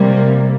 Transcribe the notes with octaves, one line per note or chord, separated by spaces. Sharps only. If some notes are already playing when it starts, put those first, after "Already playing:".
Already playing: C3 G3 A#3